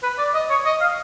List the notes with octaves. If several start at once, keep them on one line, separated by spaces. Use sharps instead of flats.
B4
D5
D#5
C#5
D#5
F5